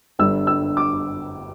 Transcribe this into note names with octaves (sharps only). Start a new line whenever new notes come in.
G1 G2 D3 G3 E6
E6
D6